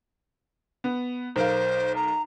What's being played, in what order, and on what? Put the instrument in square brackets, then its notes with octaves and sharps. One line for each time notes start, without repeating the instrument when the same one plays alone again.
[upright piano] B3
[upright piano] B1 A#4 F5 [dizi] C5
[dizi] A#5